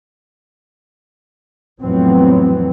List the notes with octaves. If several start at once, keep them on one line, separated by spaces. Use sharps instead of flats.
F2 A2 E3 F#3 B3 C4